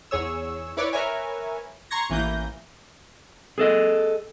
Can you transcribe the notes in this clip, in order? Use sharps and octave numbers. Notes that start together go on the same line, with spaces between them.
E2 G#4 C#5 E6
E4 B4 C#5 D5
A#4 B4 C#5 E5 G#5
A#5 C6 C#6 G#6 A#6
A1 E3 A#3 G6 A#6
G#4 A4 D#5